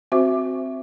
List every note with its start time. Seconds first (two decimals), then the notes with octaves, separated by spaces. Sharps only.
0.12 C4 F#4 C5 E5 D6